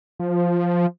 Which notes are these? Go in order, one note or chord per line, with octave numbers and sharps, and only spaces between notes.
F3